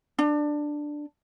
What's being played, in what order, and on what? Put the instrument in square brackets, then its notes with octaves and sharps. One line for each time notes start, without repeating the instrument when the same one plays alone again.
[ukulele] D4